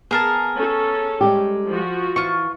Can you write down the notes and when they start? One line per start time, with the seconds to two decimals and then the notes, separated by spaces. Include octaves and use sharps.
0.11 B3 G#4 A#4 A5
0.54 C#4 A4
1.21 G3 G#3 G4
1.68 F3 F#4
2.16 E3 F4 C#6